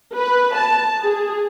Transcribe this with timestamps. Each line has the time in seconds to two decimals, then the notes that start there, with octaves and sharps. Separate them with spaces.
0.15 B4
0.56 A5
1.02 G#4